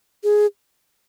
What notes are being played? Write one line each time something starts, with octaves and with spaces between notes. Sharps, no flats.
G#4